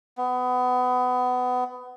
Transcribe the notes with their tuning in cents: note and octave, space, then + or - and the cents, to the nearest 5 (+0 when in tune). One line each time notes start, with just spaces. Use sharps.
B3 +25